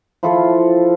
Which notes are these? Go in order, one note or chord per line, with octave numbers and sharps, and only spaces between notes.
F3 E4 F4 A4